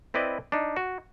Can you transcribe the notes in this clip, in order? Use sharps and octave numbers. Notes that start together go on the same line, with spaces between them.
C4 E4 B4 D5 D#5
D4 D#4
F#4